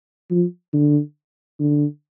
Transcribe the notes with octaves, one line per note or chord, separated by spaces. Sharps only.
F3
D3
D3